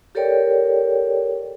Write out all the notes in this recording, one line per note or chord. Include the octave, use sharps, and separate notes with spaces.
G4 A4 A#4 C#5 D5 G5